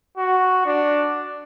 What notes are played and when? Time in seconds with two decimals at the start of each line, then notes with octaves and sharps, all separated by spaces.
0.17 F#4
0.66 D4